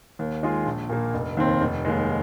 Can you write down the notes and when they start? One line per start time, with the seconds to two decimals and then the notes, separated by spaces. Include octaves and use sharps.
0.19 D#2
0.43 D#3 G#3 F4 G#4
0.66 A#1
0.90 A#2 A#3
1.14 F1
1.37 D#2 D#3 C4
1.61 F1
1.85 D#2 D#3 G#3